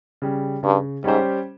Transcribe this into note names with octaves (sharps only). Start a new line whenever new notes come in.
C#3 G3
G2 C#3
G#2 G3 C#4 G4 C5